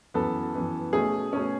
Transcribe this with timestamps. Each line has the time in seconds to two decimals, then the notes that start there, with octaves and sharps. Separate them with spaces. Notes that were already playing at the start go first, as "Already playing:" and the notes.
0.14 F#2 E3 B3 A4
0.54 F#2 E3 B3
0.93 B2 A3 C#4 G#4
1.33 B2 A3 C#4